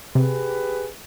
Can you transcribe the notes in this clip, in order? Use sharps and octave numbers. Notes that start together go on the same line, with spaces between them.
C3 G4 G#4 B4